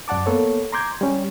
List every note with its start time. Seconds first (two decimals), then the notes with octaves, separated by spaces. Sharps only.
0.08 F#2 D5 F#5 A5 D6
0.26 A#3 B3 A4 C#5
0.72 A#5 C6 D6 G6 G#6
1.01 G3 C#4